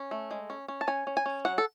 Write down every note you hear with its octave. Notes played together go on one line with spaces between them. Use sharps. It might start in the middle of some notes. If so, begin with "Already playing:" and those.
Already playing: C#4
A3
G#3
C#4
C#4
A5
C#4 G#5
C#4
G#5
C#4
F#3 F#5
A4